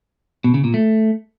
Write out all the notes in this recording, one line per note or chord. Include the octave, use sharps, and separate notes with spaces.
B2
C#3
A#2
A3